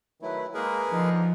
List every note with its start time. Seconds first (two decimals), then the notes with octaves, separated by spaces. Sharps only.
0.22 D#3 F#3 A3 E4 B4
0.54 G#3 A#3 G#4 A#4 B4
0.90 D3 F3 D#4